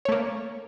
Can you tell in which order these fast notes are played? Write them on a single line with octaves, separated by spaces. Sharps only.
C#5 A3 A#3